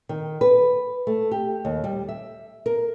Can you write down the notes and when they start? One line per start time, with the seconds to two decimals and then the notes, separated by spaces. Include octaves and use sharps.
0.09 D#3
0.41 B4
1.07 A3
1.31 G4
1.65 D#2
1.84 G3
2.09 E5
2.66 A#4